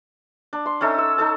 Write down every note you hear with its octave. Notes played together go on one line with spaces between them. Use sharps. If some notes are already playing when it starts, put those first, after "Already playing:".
D4
C6
C#4 D#4 A4 E5
E6
D#4 A4 A5